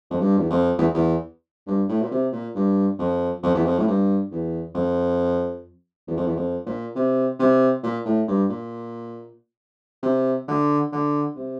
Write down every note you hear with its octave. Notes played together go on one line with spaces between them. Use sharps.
F2
G2
E2
F2
E2
E2
G2
A2
A#2
C3
A#2
G2
F2
F2
E2
F2
A2
G2
E2
F2
E2
F2
E2
F2
A#2
C3
C3
A#2
A2
G2
A#2
C3
D3
D3
C3